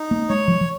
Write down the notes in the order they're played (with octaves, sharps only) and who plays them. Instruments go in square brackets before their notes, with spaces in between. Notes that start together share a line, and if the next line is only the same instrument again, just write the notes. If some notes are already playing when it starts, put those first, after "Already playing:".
Already playing: [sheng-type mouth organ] D#4
[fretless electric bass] A#3
[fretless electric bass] G#3 [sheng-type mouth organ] C#5
[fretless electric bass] F3
F3